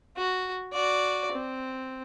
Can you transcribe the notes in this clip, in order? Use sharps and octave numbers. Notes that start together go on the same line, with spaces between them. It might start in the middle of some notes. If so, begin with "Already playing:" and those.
F#4
F#4 D5
C4